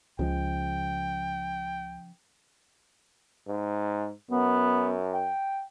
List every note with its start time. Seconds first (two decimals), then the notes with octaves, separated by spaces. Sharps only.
0.19 C#2 C#3 F3 G#3 G5
3.48 G#2
4.31 F#2 B3
5.14 G5